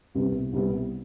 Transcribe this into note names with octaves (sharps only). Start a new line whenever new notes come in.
C2 C3 G3 B3
C2 C3 G3 B3